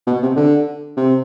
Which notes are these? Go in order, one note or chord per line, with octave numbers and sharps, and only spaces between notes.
B2
C3
D3
C3